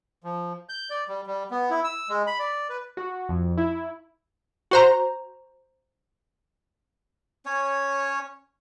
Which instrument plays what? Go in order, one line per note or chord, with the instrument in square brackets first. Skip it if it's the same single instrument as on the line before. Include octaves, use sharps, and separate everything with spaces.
[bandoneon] F3
G6
D5
G3
G3
B3
E4
E6
G#3
B5
D5
B4
[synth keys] F#4
F2
E4
[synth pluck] F#4 C5 A#5
[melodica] C#4 C#5